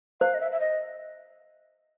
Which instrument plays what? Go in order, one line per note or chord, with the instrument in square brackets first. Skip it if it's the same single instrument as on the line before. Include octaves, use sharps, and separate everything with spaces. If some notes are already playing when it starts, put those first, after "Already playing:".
[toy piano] C5 [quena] F5
[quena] D#5
E5
E5
D#5